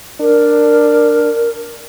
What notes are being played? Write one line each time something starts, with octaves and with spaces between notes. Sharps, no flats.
D4 A#4